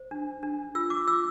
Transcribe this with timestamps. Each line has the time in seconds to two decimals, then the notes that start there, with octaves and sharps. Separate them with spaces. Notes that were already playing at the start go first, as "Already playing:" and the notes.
Already playing: C5
0.11 D4
0.43 D4
0.75 F4 E6
0.90 D6
1.07 F4 E6